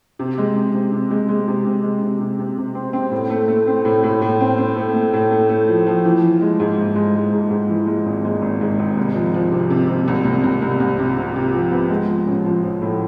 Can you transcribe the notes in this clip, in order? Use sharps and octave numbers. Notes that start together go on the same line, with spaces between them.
C3
G#3
C3
C3
C3
G#3
G#3
C3
C3
G#3
C3
C3
C3
C3
C4
C4
A2
A3
A3
C4
A2
A2
A2
C4
C4
A3
A3
A2
A3
A3
F3
F3
E3
E3
G#3
G#2
G#2
G#3
G#3
G#2
G#2
E3
G#3
G#1
G#3
G#1
G#2
G#1
C2
F3
F3
C3
C3
C3
C2
C2
C2
C2
C2
C3
C3
C3
F3
B3
G#3
F3
A1
F3
F3
A2